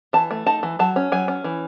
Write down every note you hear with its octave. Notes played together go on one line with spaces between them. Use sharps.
E3 A5
A3
D#4 A5
E3
F#3 A5
C#4
F#3 G#5
C#4
E3